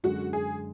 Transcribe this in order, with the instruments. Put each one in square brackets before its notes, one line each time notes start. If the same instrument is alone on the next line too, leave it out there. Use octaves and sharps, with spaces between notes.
[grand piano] F#2 D3 G#3 [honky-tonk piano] F#4
[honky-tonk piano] G#4